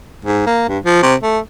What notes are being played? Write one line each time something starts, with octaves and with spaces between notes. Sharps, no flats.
G#2
A#3
G2
F3
C3
A3